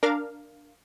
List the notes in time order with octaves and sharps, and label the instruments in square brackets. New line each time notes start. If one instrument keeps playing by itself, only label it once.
[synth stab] D4 A#4 F5